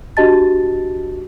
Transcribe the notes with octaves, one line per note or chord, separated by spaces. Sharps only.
D4 F#4 G4 D#5 A5 A6